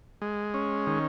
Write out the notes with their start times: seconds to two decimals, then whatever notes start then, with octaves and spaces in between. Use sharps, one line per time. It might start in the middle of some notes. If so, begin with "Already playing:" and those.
0.22 G#3
0.54 C#4
0.87 D#3